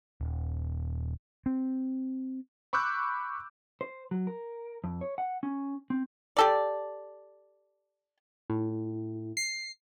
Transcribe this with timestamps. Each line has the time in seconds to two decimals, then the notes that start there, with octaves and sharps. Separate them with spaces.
0.21 D#1
1.46 C4
2.73 B5 C#6 D6 E6 F#6 G6
3.81 C5
4.11 F#3
4.27 A#4
4.84 F2
5.01 C#5
5.18 F#5
5.43 C#4
5.90 C4
6.37 G4 A4 D5
8.50 A2
9.37 C7